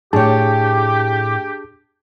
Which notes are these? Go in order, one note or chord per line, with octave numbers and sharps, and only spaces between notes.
A2 D4 G4 G#4 C#5 A5